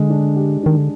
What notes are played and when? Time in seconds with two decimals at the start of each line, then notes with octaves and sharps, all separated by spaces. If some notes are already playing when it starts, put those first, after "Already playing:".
Already playing: D3 G#3
0.10 D4
0.36 G4
0.63 D#3 D4
0.77 D3